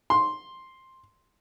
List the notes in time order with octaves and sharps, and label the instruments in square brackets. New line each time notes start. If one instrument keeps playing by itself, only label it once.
[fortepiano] C6